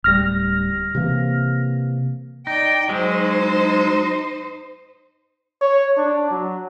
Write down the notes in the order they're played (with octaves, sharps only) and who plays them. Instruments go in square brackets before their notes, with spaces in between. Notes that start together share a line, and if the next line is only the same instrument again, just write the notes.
[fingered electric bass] D1 G3 [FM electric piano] F6 A#6
[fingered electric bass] C3 E3 A#3
[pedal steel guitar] D#4 [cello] D5 G5
[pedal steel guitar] F#3 G#3 [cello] D#4 C5
[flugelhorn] C#5
D4
F#3